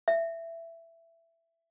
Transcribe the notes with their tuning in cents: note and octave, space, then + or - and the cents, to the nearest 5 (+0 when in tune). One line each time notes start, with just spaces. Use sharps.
E5 +15